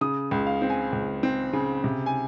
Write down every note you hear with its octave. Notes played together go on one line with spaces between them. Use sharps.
C#3 D#6
C#2
F5
C4
G#5
C#2
C4
C#3
C3
G#5